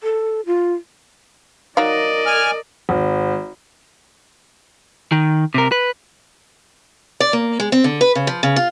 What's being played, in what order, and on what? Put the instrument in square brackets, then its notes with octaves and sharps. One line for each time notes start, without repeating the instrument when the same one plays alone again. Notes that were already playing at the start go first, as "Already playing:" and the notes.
[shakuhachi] A4
F4
[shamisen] F#3 D#4 F5 [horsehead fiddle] A#4 D#5 [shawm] D5
[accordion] G#5 F6
[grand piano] G#1
[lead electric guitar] D#3
C3 A#4
B4
[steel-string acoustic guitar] D5
A#3
G#3
C4
D3
B4
C#3
F3
C#3
F4